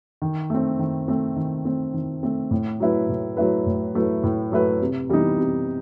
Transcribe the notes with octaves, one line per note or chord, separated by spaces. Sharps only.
D#3
A3 C4
D#3
A3 C4
D#3
A3 C4
D#3
A3 C4
A2
F#3 A3 E4 B4
A2
F#3 A3 E4 B4
A2
F#3 A3 E4 B4
A2
F#3 A3 E4 B4
C3
E3 G3 B3 D#4
C3